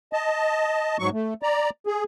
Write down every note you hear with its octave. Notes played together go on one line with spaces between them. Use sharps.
D#5 A5
G#2 F#3 C#6
A3
D5 A#5
G#4